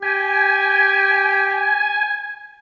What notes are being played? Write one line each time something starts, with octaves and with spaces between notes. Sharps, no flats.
G4 G#5